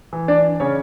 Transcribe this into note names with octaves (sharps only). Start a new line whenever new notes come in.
E3
D4 D5
C#3 C#4 C#5